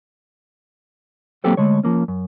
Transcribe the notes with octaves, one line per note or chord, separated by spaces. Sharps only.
F#3 A#3 C4 G4 A4 C5
D3 G#3 A3 C#5
F3 A#3 C#4
F#2